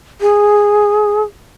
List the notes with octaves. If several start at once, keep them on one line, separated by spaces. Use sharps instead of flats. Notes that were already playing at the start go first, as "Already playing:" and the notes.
G#4